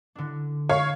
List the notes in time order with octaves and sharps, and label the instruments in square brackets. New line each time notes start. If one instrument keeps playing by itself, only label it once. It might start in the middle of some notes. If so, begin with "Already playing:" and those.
[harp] D3 D4
[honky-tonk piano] C#5 F5 C#6